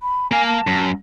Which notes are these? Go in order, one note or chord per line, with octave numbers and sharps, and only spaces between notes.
B5
A#3 F5 G#5
A5
F#2